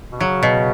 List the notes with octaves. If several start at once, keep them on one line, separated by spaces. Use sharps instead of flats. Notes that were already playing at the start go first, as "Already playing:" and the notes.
B2
C#3 F#3
B2